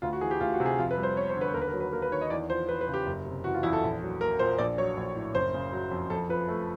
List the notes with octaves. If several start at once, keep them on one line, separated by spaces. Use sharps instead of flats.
D2 F4
F#4
E3 G#4
G4
D2 F4
F#4
C3
G#4
F2 F4
B4
G3
C5
B3 C#5
C5
D3
B4
D#2 A#4
B4
A#4
F#3
B4
A#3 A#4
B4
D#3 C#5
D#5
E2 D5
F3 C5
E2 B4
B4
C#3
G4
F#1
C3
E3 F#4
F4
E2 E4
A4
A#1
F#3
A#3 A#4
A#2 C5
A#1 D5
F#3 C#5
A#1
A2
F#1 C5
C#3
F#3
F2
F2 A4
F3 B4
A3